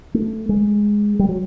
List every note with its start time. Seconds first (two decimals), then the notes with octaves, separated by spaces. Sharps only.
0.14 A3
0.49 G#3
1.19 G3
1.29 F#3